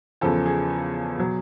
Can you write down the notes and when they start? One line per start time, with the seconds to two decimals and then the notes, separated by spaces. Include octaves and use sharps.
0.21 E2 C#3 F3 A4
0.46 G#4
1.18 B2 F#3